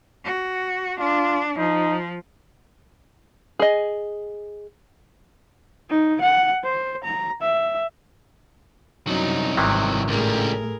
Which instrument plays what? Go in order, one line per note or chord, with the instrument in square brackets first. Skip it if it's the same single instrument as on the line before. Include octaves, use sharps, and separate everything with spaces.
[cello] F#4
[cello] D4 [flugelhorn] F4
[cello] F3 [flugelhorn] D#4
[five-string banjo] G#4 D#5
[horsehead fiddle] D#4
F#5
C5
A#5
E5
[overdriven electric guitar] C2 F#3 [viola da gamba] F#2 D#4
[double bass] G#1 [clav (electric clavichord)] C3 D#3 E3
[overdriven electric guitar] C#2 G3 [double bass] A2 A3 [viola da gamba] G#4 A#4